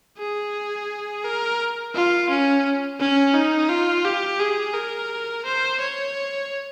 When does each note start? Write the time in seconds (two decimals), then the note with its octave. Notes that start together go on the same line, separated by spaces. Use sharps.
0.18 G#4
1.25 A#4
1.95 F4
2.29 C#4
3.00 C#4
3.34 D#4
3.69 F4
4.05 G4
4.40 G#4
4.74 A#4
5.46 C5
5.81 C#5